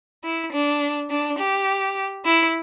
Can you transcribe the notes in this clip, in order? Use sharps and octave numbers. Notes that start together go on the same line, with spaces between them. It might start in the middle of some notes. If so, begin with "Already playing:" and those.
E4
D4
D4
G4
E4